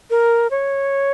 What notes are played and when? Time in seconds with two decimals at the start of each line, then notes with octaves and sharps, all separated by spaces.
0.10 A#4
0.51 C#5